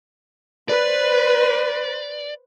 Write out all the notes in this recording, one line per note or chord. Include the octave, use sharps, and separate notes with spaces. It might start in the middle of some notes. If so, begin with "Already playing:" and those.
B4 C5 D5